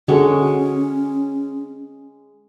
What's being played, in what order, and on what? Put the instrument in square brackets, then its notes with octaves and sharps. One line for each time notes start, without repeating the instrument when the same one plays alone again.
[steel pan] D3 F#4 A4 [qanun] G#3 C#5 [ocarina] C#4